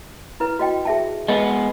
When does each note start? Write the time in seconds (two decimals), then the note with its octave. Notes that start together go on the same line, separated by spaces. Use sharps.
0.40 E4 B4
0.59 F#4 D#5 G5
0.85 G#4 E5 A5
1.29 G#3 B3 D#5